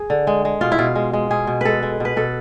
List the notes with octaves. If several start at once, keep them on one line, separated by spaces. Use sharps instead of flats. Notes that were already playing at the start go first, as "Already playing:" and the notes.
Already playing: G#4
D3
G#3
G#3
B2 F4
E4
B2 F4
G#3
G#3
B2 G#4
B2
G#3 A4 B4
G#3
B2 B4
B2 A4